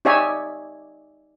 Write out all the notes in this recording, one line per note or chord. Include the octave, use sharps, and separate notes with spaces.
D#4 G4 C#5 D5 E5 G#5